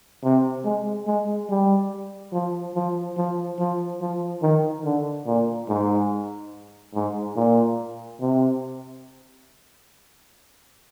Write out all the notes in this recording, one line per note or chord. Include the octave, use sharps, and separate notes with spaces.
C3
G#3
G#3
G3
F3
F3
F3
F3
F3
D#3
D3
A#2
G#2
G#2
A#2
C3